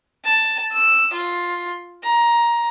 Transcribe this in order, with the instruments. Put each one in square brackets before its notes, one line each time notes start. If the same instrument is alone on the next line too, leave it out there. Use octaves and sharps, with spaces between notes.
[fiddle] A5
E6
F4
A#5